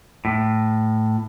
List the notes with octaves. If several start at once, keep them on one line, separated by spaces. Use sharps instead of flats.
A2